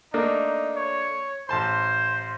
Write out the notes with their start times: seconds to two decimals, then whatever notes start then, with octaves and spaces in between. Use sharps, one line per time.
0.14 A3 A#3 D4 D#4
0.76 C#5
1.49 A1 C5 A5 C6